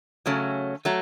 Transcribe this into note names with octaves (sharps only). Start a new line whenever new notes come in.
C#3 F#3 A3 C#4
F#3 A3